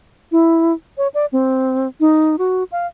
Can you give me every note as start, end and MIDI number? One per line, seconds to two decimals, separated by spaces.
0.32 0.73 64
0.98 1.08 73
1.14 1.26 74
1.32 1.88 60
2.00 2.36 63
2.39 2.64 66
2.72 2.87 77